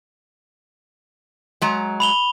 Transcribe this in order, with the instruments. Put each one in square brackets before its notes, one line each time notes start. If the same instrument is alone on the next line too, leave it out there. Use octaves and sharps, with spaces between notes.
[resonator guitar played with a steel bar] F#3 G#3 A#5
[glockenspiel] B5 F7 G7